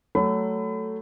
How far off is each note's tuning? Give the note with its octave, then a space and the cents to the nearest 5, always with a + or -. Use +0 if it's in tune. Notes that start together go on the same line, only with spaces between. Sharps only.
F#3 +20 A3 +5 B5 +35